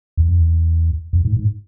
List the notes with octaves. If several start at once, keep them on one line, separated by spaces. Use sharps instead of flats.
E2
F2
E2
F2
G#2
G#2